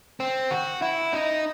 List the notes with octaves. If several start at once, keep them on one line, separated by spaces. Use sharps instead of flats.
C4
F#4
E4
D#4